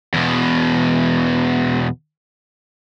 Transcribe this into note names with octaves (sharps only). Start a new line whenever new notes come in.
E2 B2